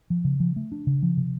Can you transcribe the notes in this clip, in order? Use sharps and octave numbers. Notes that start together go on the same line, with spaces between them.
F3
C#3
F3
A3
D4
C#3
F3
C3